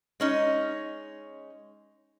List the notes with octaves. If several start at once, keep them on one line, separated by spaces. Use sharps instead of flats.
G#3 C#4 D#4